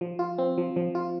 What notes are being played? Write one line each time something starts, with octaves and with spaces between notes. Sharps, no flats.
F3
F4
C4
F3
F3
F4